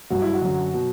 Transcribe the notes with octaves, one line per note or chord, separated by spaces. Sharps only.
G2 F#3 F#4
E4
F#4
F#2 D3 F#3
B2 F#3